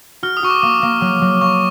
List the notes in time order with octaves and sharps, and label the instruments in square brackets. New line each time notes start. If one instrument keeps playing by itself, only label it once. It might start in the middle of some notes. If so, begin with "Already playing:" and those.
[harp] F#4 [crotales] F6
[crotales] D#6
[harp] F#4 [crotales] C#6
[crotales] D6
[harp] A#3 [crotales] D6
[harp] A#3
F#3
F#3
[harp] A#3 [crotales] C#6